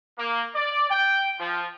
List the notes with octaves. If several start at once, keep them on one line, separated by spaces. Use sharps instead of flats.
A#3
D5
G5
F3